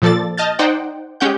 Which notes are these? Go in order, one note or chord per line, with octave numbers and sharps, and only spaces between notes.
A#2 F3 A4 D5 A6
D#5 A5 F6 G6 A6
D#4 C5 D5 F#5 G5
G#3 C#4 G4 F#5 G6